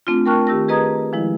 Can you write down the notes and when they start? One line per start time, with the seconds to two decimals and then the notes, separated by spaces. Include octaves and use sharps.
0.07 A3 C4 D4 F4
0.26 A#4 G5 A5 C#6 F6 F#6
0.47 D#3 G4 E6 A#6
0.68 G#4 B4 D#5 A#5 D#6 G#6
1.12 D#3 F3 G#3 E4